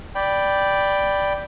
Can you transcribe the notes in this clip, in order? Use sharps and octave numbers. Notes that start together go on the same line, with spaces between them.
D5 G5 B5